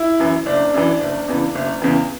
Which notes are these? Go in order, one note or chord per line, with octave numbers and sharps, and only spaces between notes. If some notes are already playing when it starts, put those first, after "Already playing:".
Already playing: E4
F#2 E3
F#1 D4
F#2 E3
F#1
E2 C#3 E3
F#1
E2 C#3 E3